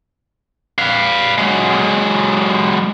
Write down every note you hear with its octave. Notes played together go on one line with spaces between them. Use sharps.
B4 F5
F#3 G#3